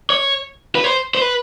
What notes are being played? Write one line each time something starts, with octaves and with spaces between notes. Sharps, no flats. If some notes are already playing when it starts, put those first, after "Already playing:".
C#5
B4
C5
C5
B4